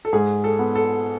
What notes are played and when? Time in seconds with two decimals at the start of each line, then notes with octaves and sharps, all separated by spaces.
0.05 A4
0.13 G#2 G#4
0.44 A4
0.59 B3
0.75 A4